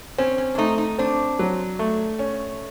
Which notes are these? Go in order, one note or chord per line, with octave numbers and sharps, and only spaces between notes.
C4 C#4
C#4
D4
A3 D#4
D#4
C4 D4
F#3
A3
C#4